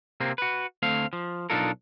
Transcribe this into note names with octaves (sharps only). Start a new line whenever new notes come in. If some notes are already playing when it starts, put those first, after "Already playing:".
C3 A#3 C4
F#4 B4
D2 A3 C4 F5
F3
B1 D4 D#4 F4 A4 A#4